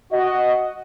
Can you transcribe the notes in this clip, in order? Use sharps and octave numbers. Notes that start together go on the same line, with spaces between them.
F#4 D#5